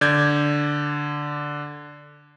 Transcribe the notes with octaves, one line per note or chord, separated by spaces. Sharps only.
D3 D5 G6 G#6